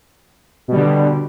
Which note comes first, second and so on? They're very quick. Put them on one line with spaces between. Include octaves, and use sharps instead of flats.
B2 G3 D3